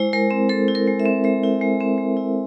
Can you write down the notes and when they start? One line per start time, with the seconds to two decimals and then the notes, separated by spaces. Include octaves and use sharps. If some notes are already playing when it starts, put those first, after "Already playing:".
Already playing: G#3 E4 C5
0.13 G#3 A#4
0.31 C4
0.49 G#3 A4
0.68 E4
0.75 A#4
0.87 G#3
1.00 E5
1.05 C4
1.24 G#3 E5
1.43 E4
1.61 G#3
1.80 C4
1.98 G#3
2.17 E4